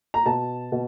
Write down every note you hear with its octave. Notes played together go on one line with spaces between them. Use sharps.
A#5
B2 A5
B2